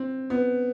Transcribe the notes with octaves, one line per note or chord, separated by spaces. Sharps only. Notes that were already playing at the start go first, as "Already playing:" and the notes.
Already playing: C4
B3